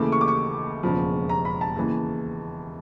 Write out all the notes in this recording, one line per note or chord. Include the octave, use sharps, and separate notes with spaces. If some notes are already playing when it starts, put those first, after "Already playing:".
Already playing: D#2 C#3 E3 A3 D6
C#6
D6
C#6
E1 D#2 C#3 F3
A#5
B5
A5
D#2 C#3 E3